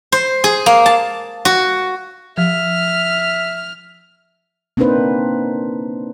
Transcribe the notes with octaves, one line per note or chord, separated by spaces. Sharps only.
C5
G#4
A#3
A5
F#4
F3 E5 F6
A#3 C4 D4 D#4 B4 C5